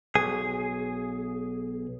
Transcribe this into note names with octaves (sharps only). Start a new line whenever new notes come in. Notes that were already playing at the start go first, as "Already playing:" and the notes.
B1 G#4